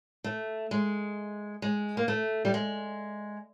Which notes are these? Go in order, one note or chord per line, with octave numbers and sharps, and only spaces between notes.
A3
G#3
G#3
A#3
A3
G3
G#3